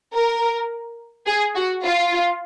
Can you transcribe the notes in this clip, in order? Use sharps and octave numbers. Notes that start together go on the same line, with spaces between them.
A#4
G#4
F#4
F4